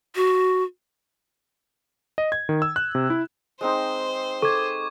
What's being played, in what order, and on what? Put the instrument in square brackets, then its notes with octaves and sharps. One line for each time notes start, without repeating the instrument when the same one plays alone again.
[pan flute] F#4
[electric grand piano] D#5
G#6
D#3
E6
F#6
C3
E4
[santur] G#3 C4 D#4 [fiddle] C5
[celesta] A4 [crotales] C#6 D6 G#6